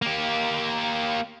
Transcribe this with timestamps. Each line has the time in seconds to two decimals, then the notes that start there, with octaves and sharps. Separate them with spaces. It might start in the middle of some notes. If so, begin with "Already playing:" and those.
0.02 A#3 G4